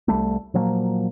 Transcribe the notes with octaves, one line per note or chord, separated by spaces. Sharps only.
C2 G3 A3
A#2 F3 F#3 A#3